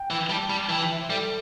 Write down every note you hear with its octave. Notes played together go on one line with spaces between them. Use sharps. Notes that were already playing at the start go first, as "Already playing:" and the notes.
Already playing: G5
E3
G3 A5
G3
E3 G5
G5
E5
C5
G3 A4